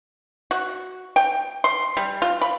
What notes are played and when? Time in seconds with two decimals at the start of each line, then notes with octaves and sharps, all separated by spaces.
0.51 F#4
1.16 G5
1.64 C6
1.97 G3
2.22 F4
2.41 B5